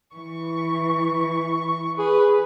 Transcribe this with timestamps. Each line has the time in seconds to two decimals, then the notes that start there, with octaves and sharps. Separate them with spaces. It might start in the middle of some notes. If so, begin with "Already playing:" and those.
0.14 E3 C#6
1.98 G#4 B4